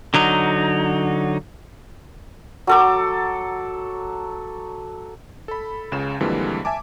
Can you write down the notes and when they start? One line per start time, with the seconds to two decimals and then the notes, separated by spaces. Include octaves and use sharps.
0.14 D3 F#3 D#4
2.67 F#3 A4 D6
5.48 A4 B5
5.92 C#2 C#3 E7
6.20 F2 D3 E3 G3 G#3 A#3
6.65 E5 G#5 A5 D6